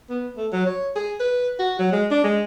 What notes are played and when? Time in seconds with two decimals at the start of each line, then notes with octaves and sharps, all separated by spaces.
0.10 B3
0.37 A3
0.52 F#3
0.66 C#5
0.96 G#4
1.20 B4
1.59 F#4
1.79 F#3
1.92 G#3
2.11 D4
2.24 G#3